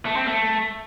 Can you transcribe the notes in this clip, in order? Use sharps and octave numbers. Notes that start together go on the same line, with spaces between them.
A3
C4
A3